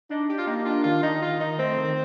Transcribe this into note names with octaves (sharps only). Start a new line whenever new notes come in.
D4 D#4
G4
F4
A#3 D#4
D4 F4
D#3 F4
D#3 D#4
D#3 F4
D#3 D#4
A3 C4
D#3